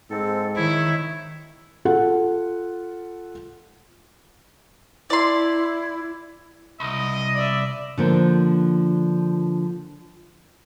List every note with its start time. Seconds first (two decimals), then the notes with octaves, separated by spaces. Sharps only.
0.10 G#2 C4 A4
0.56 D#3 E4 C#5 E5
1.85 F4 A4 F#5
5.10 E4 D5 C6
6.80 C2 D#5
7.35 D5 E5
7.98 D3 F3 A#3 D4